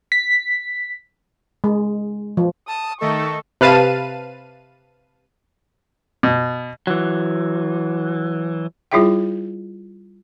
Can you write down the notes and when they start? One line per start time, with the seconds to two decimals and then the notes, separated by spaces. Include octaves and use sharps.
0.12 B6
1.64 G#3
2.37 F3
2.68 A5 D#6
3.01 D#3 A3 A4 D#5 C#6
3.61 C3 B4 F5 A5 D#7
6.23 B2
6.87 E3 F#3
8.92 G3 E4 F4 G#4 E5 G5